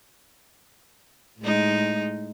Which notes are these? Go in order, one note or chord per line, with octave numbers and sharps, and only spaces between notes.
A2 G#3 D#4